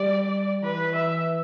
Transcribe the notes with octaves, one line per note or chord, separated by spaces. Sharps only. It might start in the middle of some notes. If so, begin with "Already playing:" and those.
Already playing: G3 D5
E3 B4
E5